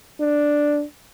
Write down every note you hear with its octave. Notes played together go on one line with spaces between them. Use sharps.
D4